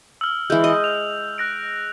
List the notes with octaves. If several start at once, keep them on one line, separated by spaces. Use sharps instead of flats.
E6 F6
E3 G#3 G6
D#5
F6 F7
F#6 A#6 D7